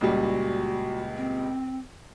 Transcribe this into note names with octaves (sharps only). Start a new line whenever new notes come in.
C#2 A#2 G3 F#4
C4